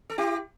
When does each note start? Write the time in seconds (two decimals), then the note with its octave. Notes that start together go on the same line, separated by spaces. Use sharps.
0.10 A4
0.18 E4 G4